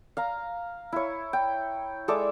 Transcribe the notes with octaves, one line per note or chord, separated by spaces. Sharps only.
F5 A#5
E4 C#5
G5
G#3 A4 D5 E5